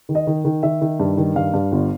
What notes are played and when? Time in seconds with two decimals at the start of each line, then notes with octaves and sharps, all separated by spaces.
0.09 D#3
0.15 D#5
0.27 D#3
0.45 D#3
0.63 D#3 E5
0.81 D#3
1.00 G2
1.17 D#3
1.36 G2 F5
1.54 G2
1.72 G1